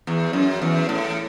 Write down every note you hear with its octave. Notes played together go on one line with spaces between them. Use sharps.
E2
F#2
E2
A2